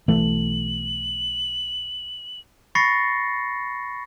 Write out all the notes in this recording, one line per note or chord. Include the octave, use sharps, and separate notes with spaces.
B1 E3 A3 F#7
B5 C#6 A6 A#6 C7 C#7